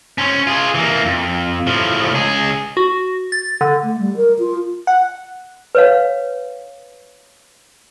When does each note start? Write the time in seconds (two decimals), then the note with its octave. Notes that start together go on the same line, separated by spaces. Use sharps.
0.18 C#4 C5
0.47 F4 G#4
0.75 E3 A#3
1.06 F2
1.67 A2 F3
2.13 C#2 G#4
2.77 F#4
3.32 A6
3.61 D3
3.83 A3
4.00 G3
4.16 A#4
4.39 F4
4.87 F#5
5.75 B4 C#5 F5